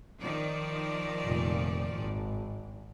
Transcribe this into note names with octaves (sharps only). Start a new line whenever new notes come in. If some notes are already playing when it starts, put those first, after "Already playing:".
D#3 F3 D5
F1 A#2
G#1